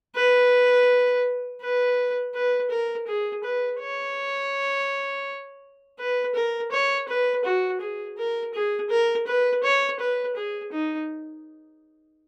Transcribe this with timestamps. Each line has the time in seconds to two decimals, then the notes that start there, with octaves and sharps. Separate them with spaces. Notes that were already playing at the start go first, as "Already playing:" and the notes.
0.16 B4
1.62 B4
2.34 B4
2.70 A#4
3.07 G#4
3.44 B4
3.80 C#5
5.99 B4
6.35 A#4
6.72 C#5
7.09 B4
7.45 F#4
7.81 G#4
8.18 A#4
8.54 G#4
8.90 A#4
9.27 B4
9.64 C#5
10.00 B4
10.36 G#4
10.72 D#4